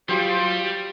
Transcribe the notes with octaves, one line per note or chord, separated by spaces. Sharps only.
F#3 G3 F4 G4 C5